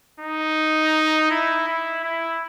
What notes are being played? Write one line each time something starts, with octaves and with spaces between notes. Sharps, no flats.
D#4
E4
E4
E4